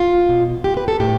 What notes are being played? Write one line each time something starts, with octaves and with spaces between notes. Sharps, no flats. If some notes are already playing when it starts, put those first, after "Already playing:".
Already playing: F4
B2
G4
B4
A4
A2 G4